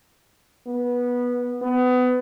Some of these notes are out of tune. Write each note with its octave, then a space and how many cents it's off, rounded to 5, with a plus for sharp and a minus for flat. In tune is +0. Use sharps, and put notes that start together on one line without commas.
B3 -15
B3 +25